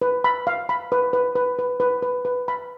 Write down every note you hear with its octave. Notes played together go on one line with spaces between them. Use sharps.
B4
B5
F5
B5
B4
B4
B4
B4
B4
B4
B4
B5